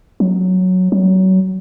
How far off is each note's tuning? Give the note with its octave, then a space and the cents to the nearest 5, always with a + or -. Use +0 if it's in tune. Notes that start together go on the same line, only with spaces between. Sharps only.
F#3 -5
F#3 +25